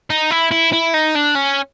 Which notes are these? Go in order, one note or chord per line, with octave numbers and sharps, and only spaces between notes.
D#4
E4
E4
E4
D#4
D4
C#4